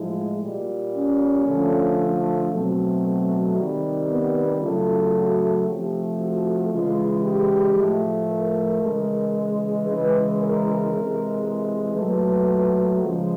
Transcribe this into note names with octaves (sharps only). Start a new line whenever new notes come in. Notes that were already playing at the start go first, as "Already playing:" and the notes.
Already playing: A2 F3 G#3 E4
A#2 G3
C#4
D3 F3 A3
B2 F#3 A3 C4
C3 D#3 G3
B3
C#3 F#3 A3 F4
F#4
C3 F3 A3 G4
F#4
C#3 E3 G#3 F4
G4
A2 F3 A3
A#4
C#3 E3 G#3
C#3 E3 G#3 B4
A#4
C3 E3 G#3
A#2 F#3 A3 B4
C#3 F3 G#3